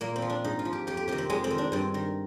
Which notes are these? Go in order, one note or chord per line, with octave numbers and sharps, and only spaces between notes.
A#2 A#3
C4
F3
D4
G#2 D#4
F4
F3
G4
F2 G4
G4
C3 D#3 G4
C4
F2 G#3
C4
D#3
D4
G2 C4
D#3